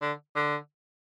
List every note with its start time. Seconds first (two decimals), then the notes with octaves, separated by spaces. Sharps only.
0.02 D3
0.35 D3